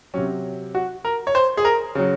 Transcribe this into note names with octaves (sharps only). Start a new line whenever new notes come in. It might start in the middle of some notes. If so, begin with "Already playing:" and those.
C3 F#3 C#4
F#4
A#4
C#5
C5
G#4
A#4
C#3 F#3